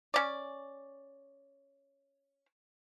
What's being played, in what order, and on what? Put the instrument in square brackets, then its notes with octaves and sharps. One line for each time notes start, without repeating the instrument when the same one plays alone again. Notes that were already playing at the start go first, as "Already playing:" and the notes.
[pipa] C#4 D5